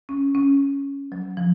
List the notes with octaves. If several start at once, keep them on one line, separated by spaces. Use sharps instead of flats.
C#4
C#4
F#3
F3